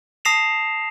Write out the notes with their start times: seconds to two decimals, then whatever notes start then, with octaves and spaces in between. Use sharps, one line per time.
0.25 A5 D#6 A#6 C7 E7 F7